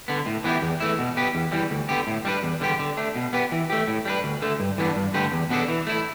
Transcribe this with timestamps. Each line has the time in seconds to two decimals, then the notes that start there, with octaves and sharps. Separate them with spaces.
0.08 D3 B3
0.26 A2
0.44 E3 B3 E4 G4
0.62 E2
0.80 E3 A3 E4
0.99 B2
1.17 B3 G4 B4
1.35 E2
1.52 E3 G3
1.71 D2
1.89 D3 B3 G4
2.07 A2
2.25 G3 D4 B4
2.43 E2
2.61 D3 G3 B3 G4
2.79 D3
2.97 A3 D4
3.15 B2
3.33 B3 G4 B4
3.52 E3
3.70 A3 G4
3.87 A2
4.05 G3 D4 B4
4.24 D2
4.42 D3 A3
4.60 G2
4.78 E3 G3 B3 D4
4.96 G2
5.14 D3 A3 G4 B4
5.32 E2
5.50 B2 B3 D4 A4
5.69 E3
5.87 A3 E4